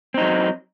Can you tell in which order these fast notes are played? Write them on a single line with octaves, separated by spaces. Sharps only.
C4 D#4 F#3